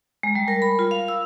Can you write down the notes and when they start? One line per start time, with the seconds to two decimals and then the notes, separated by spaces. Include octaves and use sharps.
0.23 G#3
0.35 G3
0.48 A#4
0.62 B5
0.79 F4
0.91 F5
1.08 E6